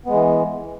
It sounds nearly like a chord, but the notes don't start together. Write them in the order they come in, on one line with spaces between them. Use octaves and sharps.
B3 G#3 E3